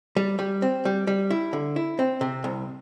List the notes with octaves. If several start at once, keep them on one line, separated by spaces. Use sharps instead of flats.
G3
G3
C4
G3
G3
E4
D3
E4
C4
C3
C2